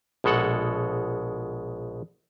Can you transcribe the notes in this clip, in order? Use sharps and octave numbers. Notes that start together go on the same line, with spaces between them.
A#1 B2 G#3 A4 F#5